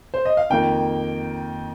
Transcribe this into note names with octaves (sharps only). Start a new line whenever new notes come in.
C5
D#5
F5
F2 D#3 A#3 G5